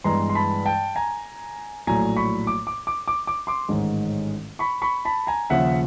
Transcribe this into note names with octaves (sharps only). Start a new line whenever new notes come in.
G2 E3 G#3 B3 A#5 C6
C6
A5 B5
G5 A5
G#5 A#5
A#1 A2 F#3 G#5 A#5
B5 C#6
D6
D6
D6
D6
D6
C6 D6
A1 G#2 D#3 G#3
B5 C#6
B5 C#6
A5 B5
G#5 A#5
D#2 C#3 F3 E5 F#5